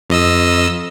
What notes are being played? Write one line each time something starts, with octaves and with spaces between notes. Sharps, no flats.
F2 D#5 E6